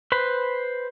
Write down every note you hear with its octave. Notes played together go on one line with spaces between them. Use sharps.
B4 C5 B5